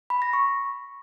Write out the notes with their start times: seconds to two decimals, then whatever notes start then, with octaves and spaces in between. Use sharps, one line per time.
0.10 B5
0.22 A#6
0.33 C#6